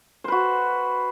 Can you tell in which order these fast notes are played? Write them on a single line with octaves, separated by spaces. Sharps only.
C5 B4 F#4